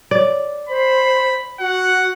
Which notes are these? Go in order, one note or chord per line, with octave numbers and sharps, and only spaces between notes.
D5
C5 B5
F#4 F#5